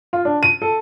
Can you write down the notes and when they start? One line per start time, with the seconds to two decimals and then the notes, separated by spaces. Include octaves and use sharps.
0.13 F4
0.25 D4
0.43 D#7
0.62 A4